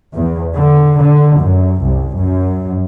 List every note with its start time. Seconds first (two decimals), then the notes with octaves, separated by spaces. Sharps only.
0.13 E2
0.55 D3
1.01 D3
1.39 F#2
1.82 C2
2.17 F#2